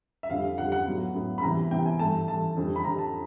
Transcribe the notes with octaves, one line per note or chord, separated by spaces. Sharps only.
E5
F2 D3 G3 F5
F2 D3 G3 F#5
F#5
A2 F#3 B3
A2 F#3 B3
B5
C3 E3 G3 B3 A#5
C3 E3 G3 B3 G5
G#5
G2 E3 A3 A5
G2 E3 A3 A5
F2 D3 G3
B5
F2 D3 G3 A#5
A5